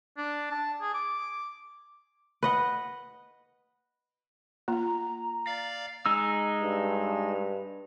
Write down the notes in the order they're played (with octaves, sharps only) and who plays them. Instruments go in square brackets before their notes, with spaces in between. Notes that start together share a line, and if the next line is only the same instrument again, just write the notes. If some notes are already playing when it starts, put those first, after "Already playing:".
[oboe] D4
A5
G#4
D6
[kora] B4 D#5 F#5
[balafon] A#3 [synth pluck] F4 [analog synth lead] A#5
[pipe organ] D5 F5 [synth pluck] A6
[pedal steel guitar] G#3 D#4 E6
[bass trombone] G2